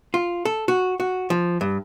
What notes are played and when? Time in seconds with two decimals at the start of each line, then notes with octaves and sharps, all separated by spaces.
0.14 F4
0.45 A4
0.68 F#4
1.00 F#4
1.30 F3
1.61 G2